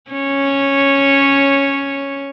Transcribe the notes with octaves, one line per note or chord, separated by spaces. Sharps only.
C#4 C#5